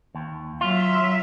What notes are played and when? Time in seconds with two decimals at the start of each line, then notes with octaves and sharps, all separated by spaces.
0.15 D#2
0.61 F#3 F4 E5